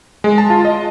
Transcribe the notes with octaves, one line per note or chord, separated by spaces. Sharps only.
G#3
A5
F4
D#5